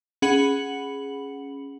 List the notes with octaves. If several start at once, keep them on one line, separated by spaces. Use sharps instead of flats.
C#4 G#4 F#5 B5 C#7 F#7